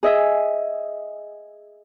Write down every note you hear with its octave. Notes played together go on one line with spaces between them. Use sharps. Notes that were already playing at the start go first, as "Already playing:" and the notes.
G#4 D#5 E5